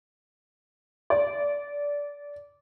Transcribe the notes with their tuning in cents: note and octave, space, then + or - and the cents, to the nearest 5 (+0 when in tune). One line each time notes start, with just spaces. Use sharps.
D5 -20